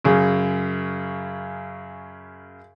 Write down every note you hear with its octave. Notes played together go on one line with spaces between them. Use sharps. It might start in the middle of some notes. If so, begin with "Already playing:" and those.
F#2 C#3